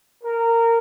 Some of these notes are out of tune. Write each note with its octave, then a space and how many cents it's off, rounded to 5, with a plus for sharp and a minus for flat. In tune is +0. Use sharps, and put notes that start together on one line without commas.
A#4 -15